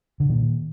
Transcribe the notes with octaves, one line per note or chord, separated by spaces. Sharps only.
D3
A#2 D#3